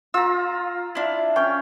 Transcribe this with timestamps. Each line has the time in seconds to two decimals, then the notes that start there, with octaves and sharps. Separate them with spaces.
0.14 F4 A#5 E6
0.95 D4 E4
1.36 C#4 C#5 G5